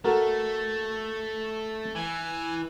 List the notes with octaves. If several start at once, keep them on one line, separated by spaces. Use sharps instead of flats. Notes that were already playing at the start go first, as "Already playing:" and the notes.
A3 F#4 A4 A#4
E3 G#5